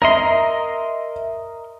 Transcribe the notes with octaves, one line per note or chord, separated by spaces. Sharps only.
A#4 D#5 E5 C6